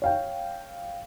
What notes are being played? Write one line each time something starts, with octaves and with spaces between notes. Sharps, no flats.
C#5 F5 G5